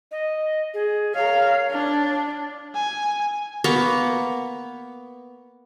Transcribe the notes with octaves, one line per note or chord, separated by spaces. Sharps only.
D#5
G#4
A#4 C#5 F5
D4
G#5
A#3 B3 C#6